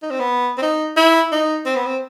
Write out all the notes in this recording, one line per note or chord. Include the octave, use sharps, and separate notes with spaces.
D#4
C4
B3
C4
D#4
E4
D#4
C4
B3
C4